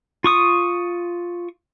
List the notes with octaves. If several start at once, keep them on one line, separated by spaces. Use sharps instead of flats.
F4 C#6 D#6